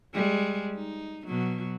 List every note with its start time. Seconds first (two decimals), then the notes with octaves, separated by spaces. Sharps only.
0.14 G3 G#3
0.75 D#4
1.27 B2 F#3